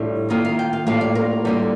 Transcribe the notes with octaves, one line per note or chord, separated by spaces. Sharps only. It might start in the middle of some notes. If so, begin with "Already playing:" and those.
Already playing: A2 G3 D4 F4
D#3 A#3 F4 D#5
F5
G5
F5
A2 G3 A#3 D4 F4 F5
D5
A#4
D3 G3 A#3 F4